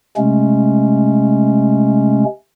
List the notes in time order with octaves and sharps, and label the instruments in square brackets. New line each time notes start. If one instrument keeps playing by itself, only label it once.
[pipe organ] C3 G#3 A3 C#4